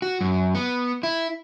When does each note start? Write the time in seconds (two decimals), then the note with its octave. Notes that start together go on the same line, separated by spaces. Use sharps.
0.02 F#4
0.21 F#2
0.55 B3
1.03 E4